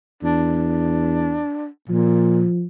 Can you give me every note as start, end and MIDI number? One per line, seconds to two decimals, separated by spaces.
0.23 1.42 40
0.23 1.67 62
1.89 2.45 46
1.89 2.67 53